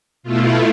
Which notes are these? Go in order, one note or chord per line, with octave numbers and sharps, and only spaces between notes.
B2 A3 E4 F4